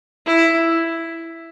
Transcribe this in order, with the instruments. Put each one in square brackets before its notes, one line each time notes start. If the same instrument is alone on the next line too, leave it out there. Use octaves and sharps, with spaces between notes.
[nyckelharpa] E4